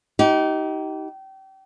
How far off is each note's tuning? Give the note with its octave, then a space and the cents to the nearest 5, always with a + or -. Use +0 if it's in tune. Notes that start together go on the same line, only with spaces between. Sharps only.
D#4 +20 G4 -30